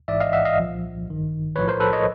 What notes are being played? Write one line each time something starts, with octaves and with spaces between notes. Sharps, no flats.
A1 G#2 E3 D5 E5
D#5 F5
E5 F#5
D#5 F5
C2 A#2 F3
A1 G2 D#3
B1 A2 F3 B4 C#5
A#4 C5
A4 B4
C#5 D#5